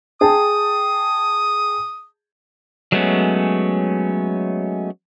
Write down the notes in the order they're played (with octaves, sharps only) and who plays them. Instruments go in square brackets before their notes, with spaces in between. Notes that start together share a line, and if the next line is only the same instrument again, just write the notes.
[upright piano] G#4 G5 A5 [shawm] D#6
[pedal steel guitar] F#3 G#3 A3 B3 C#4